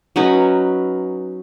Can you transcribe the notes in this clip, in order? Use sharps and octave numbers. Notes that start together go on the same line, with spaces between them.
F#3 C#4 D#4 B4